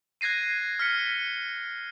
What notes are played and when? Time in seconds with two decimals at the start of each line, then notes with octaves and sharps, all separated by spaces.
0.21 F#6 G#6 A#6 C7 D#7
0.79 F6 B6 C#7